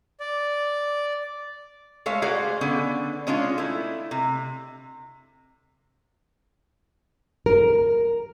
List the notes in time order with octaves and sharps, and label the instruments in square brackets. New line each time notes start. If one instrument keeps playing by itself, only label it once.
[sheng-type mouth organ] D5
[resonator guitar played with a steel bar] G#3 A3 C#5 F5
F#4 G#4 C5 D5 F5
D3 B3 C#4
G#3 C#4 D4 F4
A3 E4
C3
[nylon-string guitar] A#4